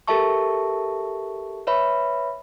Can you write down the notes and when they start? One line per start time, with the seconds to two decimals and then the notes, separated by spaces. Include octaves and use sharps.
0.07 G4 A4 A#4 E5 A5 C#6
1.67 B4 C#5 E5 B5